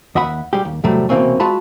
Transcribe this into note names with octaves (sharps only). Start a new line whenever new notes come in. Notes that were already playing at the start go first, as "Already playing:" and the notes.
D#2 D#5 E5 F#5 B5
G3 G#3 G4
D#2
E2 A2 C3 F#3 G3 A3
C2 B2 E3 A#3 C4 C#4
G#3 F4 F#4 A5 B5